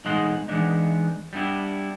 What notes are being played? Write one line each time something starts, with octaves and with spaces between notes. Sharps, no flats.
B1 E3 G#3 D#4 F#5 C6
E3 G#3 B3 D4 D#4
G3 B3 D4 E4 G4